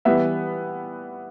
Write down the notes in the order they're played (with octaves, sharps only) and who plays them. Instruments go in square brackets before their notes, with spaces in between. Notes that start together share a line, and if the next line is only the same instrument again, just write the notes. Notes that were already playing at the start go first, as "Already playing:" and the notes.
[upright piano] E3 G3 B3 E5